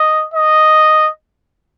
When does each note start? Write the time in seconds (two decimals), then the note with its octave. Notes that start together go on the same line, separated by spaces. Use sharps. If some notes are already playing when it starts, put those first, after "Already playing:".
Already playing: D#5
0.34 D#5